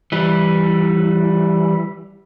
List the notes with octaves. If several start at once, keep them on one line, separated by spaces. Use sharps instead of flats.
E3 G3